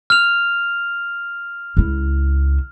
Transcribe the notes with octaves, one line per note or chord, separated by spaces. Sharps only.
F6 F7
C#2 E4